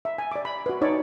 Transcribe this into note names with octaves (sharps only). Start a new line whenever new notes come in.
E5
G#5
D5 D6
B5
F#4 B4
D#4 C#5 D5